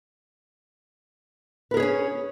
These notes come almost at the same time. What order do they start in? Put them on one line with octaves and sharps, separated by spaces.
B4 A#4 G#4 C#5 C#4